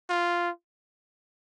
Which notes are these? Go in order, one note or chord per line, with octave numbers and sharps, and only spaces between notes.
F4